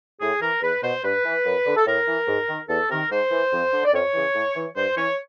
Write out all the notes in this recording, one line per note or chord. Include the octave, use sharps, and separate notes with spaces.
A2 G#4
E3 A#4
E2 B4
B2 C5
G2 B4
E3
F#2
D3
A4
A2 A#4
E3
G#2
D#3
E2 A4
C3 D#3 A#4
G#2 C5
E3
F2
D3
D5
F2 C#5
C#3 E3
A2
E3
G2 C5
E3 C#5